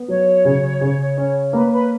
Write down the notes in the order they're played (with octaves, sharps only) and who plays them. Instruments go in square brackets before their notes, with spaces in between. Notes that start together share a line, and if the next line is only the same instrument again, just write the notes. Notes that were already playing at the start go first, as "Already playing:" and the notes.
Already playing: [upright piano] B3
[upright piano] F#3 [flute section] C#5
[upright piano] C#3
C#3
C#4
[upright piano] A#3 [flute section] B4
[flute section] B4